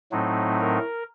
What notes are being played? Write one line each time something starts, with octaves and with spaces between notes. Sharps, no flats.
A2 F#3 A3 C4 D#4
A#4